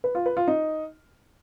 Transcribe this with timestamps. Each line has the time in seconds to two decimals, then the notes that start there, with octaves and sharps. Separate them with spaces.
0.04 B4
0.15 F4
0.26 B4
0.37 F4
0.48 D#4